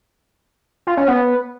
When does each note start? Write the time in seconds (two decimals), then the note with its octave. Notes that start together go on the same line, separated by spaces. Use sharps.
0.87 F4
0.97 C#4
1.07 B3